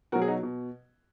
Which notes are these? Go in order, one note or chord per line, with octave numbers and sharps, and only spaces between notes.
B2 F#3 F#4 A#4
G#4
D#4 F#4
B2